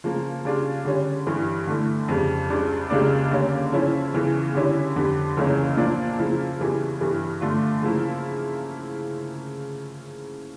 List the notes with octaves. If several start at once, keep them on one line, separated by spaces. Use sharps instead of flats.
C#3 F3 A#3
C#3 G3 D4 F4
D3 G3 C#4
G2 E3 G3
D3 A3 E4
F2 C#3 G3
C#2 C#3 G3 D4
C#2 C#3 G3 A#3 D4
D3 G3 A#3 C#4
C#3 F3 C#4 E4
E2 C#3 E3
D3 G3 C#4 E4
F2 D3 G3
C#2 C#3 E3 A#3 C#4
A#2 F3 A#3 D4
C#3 F3 A#3 E4
E2 C#3 E3 G3
G2 E3 G3
D3 A3 D4 F4
C#3 F3 A#3 E4